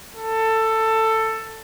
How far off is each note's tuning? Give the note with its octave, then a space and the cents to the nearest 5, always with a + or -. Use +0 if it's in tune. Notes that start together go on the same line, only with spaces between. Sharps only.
A4 +15